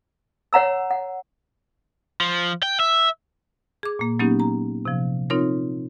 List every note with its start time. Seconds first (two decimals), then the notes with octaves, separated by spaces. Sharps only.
0.53 C#5 F#5 A#5 E6
0.91 F#5
2.20 F3
2.63 G5
2.80 E5
3.83 G#4 D6
3.99 A#2 A#3
4.19 F#3 A#3 B3 C#4 D#4 G4
4.40 A#5
4.85 C3 F3
5.30 C4 D#4 F4 A#4 C#5